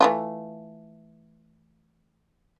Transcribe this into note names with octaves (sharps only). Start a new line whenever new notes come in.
E3 A3 F4